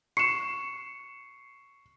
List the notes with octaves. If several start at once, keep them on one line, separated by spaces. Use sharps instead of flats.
C#6 C7 C#7 E7